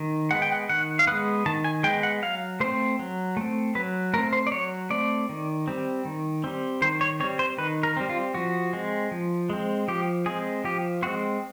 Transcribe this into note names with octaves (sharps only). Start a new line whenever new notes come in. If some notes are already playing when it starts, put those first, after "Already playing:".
Already playing: D#3
G#3 B3 F#5
G5
F#5
D#3 F#5
F5
G#3 B3 F#5
D#3 A5
G#5
G#3 B3 G5
F#5
F#3 F5
A3 C4 C5
F#3
A3 C4
F#3 B4
A3 C4 A#4
C5
D5
F#3 C#5
A3 C4 D5
D#3
G3 C4
D#3
G3 C4
D#3 C5
C#5
G3 C4 C#5
C5
D#3 B4
A#4
G3 C4
F4
F3 F#4
G#3 C4
F3
G#3 C4
F3 G4
G#3 C4 G#4
F3 G4
G#3 C4 F#4